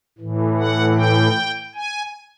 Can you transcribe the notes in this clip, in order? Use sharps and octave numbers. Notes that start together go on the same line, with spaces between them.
A2 E3
F#5
G5
G#5